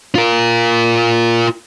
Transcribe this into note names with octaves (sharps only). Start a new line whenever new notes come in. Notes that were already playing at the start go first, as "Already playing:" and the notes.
F4 A#4